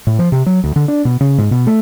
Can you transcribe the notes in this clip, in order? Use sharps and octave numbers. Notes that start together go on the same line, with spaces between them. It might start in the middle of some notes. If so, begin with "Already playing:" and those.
A2
F3
C3
F#3
D2
D3
D4
B2
C#3
G#2
B2
A3